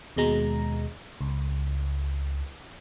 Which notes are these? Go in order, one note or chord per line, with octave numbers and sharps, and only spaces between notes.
D#2 B2 G#3 A#5
C#2